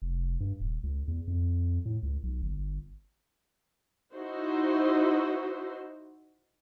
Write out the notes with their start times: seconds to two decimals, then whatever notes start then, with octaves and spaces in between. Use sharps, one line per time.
0.02 F1
0.40 G2
0.60 D#1
0.83 C#2
1.08 E2
1.28 F2
1.86 A2
2.03 C#2
2.23 B1
2.42 G1
4.14 D#4 E4 F#4 C5